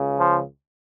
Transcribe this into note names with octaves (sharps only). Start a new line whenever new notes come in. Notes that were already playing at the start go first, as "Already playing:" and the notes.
Already playing: C#2 C#3
F3